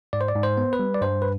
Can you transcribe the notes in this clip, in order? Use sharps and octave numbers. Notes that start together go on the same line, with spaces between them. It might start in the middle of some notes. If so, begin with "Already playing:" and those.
G#2 D5
C5
D5
G#2
C5
B3
B4
G3
D5
G2 C5
B4